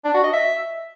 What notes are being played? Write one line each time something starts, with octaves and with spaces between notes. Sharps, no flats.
D4
F#4
D#5
E5